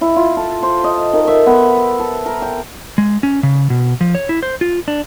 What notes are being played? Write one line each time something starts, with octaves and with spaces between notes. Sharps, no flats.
E4
F4
A4
C5
D#5
D#3
E5
B3
A4
A#4
G5
G#3
C#4
C#3
B2
F3
C#5
E4
C5
F4
D4